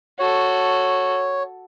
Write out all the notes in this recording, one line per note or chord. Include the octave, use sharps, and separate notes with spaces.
F#4 A4 C#5